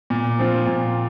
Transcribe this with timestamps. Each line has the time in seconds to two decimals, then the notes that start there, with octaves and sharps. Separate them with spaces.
0.10 A#2
0.39 F3 C4 F4
0.67 A#2